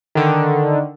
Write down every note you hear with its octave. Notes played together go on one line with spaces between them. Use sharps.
D3 D#3